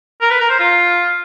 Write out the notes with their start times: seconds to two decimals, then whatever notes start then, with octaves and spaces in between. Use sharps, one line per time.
0.21 A#4
0.31 B4
0.40 A#4
0.50 C5
0.59 F4